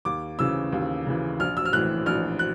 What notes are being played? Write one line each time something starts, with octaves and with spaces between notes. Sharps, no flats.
D#2 D6
C#3 E3 E6
D#2
C#3 E3
A#1 F6
E6
F6
A2 E3 F#6
A#1 F6
F#6